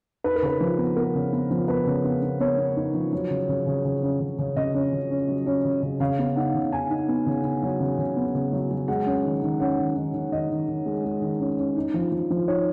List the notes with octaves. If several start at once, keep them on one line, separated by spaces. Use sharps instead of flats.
D#4 B4
A#4
C#3 B4
F3
B3
B3 A#4
C#3
B3
F3
B3 B4
C#3
B3
B3
B3 C#5
B3
D#4
F3
F#3
C#3
C#3
C#3
C#3
C#4
C#3
C#3
C#3 D#5
C#4
C#3
C#4
F#3
C#4
C#3
C#3
C#3 F5
B3
D#4 F#5
C#3
D#4 G#5
D#4
B3
C#3
B3
F#3
C#3
C#3
B3
C#3
F#3
F#3
G#3 F#5
C#4
D#3
D#3
C#4 F#5
D#3
D#3
D#3
D#3 D#5
D#3
D#3
G#3
G#3
D#3
C#4
C#4
D#4
F3
F3
F3
D#4 C#5